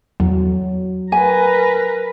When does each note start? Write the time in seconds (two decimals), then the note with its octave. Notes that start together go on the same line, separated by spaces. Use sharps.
0.20 E2 F#3
1.12 A#4 B4 G#5